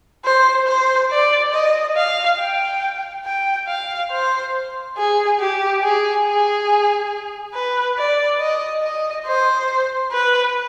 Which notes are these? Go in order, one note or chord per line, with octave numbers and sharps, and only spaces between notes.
C5
C5
D5
D#5
F5
G5
G5
F5
C5
G#4
G4
G#4
G#4
B4
D5
D#5
D#5
C5
B4